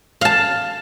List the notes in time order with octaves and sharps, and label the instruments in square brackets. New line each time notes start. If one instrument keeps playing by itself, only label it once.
[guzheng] F5 A5